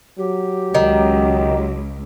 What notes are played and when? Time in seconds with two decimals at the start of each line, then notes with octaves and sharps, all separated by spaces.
0.18 F#3 G4
0.75 C#2 D#3